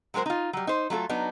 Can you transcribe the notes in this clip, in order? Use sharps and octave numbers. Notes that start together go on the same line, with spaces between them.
F#3 G#3 F#4 A#4 C5
D#4 F4
F#3 G3
D#4 C5
F#3 A3 F4 A4
F#3 B3 D4 D#4